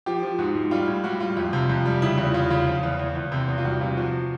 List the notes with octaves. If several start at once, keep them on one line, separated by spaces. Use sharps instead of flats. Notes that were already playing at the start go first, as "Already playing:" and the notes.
F3 G4
F3
G#2 F#4
G#2
G3 F4
A2
G3 F#4
G3 F4
F2 F4
C3
F2 F4
G3
C#3 E4
E2 F4
E2 F4
C#3 F4
F3 F4
E2
E2
E2
C3
E2
F4
G3 F#4
C3 F4
F3 F#4